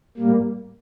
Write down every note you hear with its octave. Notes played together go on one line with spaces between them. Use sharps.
A2 G3 A#3